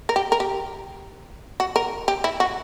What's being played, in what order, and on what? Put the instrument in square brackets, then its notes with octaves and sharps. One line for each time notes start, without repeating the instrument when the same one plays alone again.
[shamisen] A#4
G4
A#4
G4
F#4
A#4
G4
E4
F#4